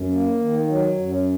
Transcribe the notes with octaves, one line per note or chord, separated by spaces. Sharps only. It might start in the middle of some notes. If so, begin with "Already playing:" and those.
Already playing: F#2
A#3
D#3
F#3
F#2